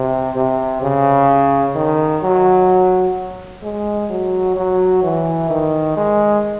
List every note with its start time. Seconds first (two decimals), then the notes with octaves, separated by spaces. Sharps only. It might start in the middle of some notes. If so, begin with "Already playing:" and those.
Already playing: C3
0.35 C3
0.82 C#3
1.75 D#3
2.23 F#3
3.63 G#3
4.10 F#3
4.56 F#3
5.03 E3
5.50 D#3
5.97 G#3